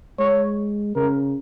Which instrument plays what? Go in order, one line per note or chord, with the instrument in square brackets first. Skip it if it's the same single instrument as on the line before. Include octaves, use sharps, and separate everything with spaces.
[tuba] G#3 [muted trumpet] C#5
[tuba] C#3 [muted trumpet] A#4